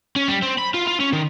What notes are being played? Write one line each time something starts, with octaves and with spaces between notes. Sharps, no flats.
C#4
G3
C4
B5
F4
F4
C#4
D#3